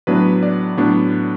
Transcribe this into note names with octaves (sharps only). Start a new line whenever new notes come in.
A2 F#3 B3 D4 B4
D5
A2 F#3 B3 D4